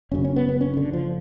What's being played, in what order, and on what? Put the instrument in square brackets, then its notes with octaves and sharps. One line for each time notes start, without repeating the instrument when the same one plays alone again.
[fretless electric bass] F#1 F#2 C#3 C#4
C#4
B3
B3
C#4
D3
F3